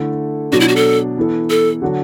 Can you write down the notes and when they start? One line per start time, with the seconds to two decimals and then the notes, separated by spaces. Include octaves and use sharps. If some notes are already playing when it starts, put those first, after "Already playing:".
Already playing: D3 A3 E4 A4
0.52 B2 F#3 D4 F#4
0.60 E4
0.68 F#4
0.76 A4
1.17 E3 B3 E4 A4
1.50 A4
1.82 D3 F#3 D4 F#4 A4